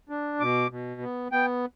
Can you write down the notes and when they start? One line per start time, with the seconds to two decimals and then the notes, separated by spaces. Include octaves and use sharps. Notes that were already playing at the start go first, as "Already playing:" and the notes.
0.09 D4
0.40 B2 D6
0.71 B2
1.01 B3
1.32 B3 G5